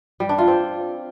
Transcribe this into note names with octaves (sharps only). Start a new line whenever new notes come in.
G3
D4
F4
C4